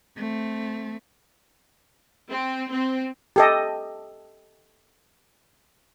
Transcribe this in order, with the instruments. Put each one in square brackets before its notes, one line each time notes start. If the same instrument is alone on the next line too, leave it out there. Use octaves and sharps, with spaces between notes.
[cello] A3 C4
[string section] C4
C4
[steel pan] G4 A4 D#5